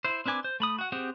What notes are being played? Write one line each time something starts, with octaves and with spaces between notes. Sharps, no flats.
E4 C5
C4 D4 B4 G#5 D6
C5
A3 B5 D#6
F#4 F#5
C4 G4 G#4 C5 F#5